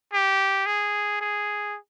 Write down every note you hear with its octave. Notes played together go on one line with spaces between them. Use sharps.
G4
G#4
G#4